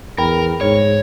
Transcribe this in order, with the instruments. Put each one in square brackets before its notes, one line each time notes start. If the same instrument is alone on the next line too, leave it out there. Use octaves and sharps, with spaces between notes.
[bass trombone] E2 [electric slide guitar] A#4 [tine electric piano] G5 B5
[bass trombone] G#2 [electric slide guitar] C#5